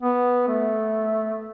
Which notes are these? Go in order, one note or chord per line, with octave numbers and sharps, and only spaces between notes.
B3
A3